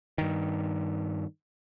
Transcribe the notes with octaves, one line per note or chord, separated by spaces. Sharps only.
G2 D#3